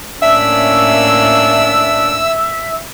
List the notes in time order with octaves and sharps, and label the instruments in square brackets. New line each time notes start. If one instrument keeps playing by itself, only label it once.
[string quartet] A2 A#3 C#4 [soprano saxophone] D4 [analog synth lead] E5 [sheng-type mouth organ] E6